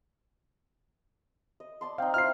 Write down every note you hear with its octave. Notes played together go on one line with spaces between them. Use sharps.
D#5
D5 A5 C6
C4 D#4 F5 G5
E4 F4 C5 F6 C7